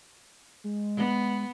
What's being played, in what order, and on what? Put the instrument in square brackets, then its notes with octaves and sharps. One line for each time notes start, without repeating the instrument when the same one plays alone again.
[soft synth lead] G#3
[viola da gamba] B3